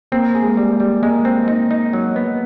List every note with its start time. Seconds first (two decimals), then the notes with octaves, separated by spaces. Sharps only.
0.12 A#3 C4
0.35 G#4
0.42 G#3
0.57 G3
0.80 G3
1.02 G#3 A#3
1.25 C4
1.48 D#4
1.71 D#4
1.93 F#3
2.16 B3